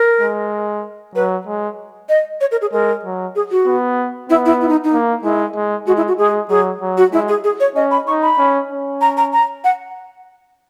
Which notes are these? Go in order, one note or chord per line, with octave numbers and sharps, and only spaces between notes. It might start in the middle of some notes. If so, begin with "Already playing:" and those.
Already playing: A#4
G#3
F#3 B4
G#3
D#5
C#5
A#4
G#4
G#3 A#4
F#3
G#4
F#4
B3
B3 E4
E4
E4
D#4
D#4
A#3
G#3 E4
G#3
G#3 F#4
E4
F#4
G#3 G#4
F#3 G#4
F#3
F#4
G#3 E4
G#4
G#4
C#5
C#4 D#5
B5
D#4 C#6
B5
C#4
C#4
A#5
A#5
A#5
F#5